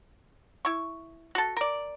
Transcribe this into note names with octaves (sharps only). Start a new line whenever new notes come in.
E4 C#6
F#4 A4
A#4 D5